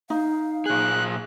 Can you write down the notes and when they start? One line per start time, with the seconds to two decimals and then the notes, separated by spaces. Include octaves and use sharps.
0.10 D#4 F5
0.66 A#2 G#4 F#6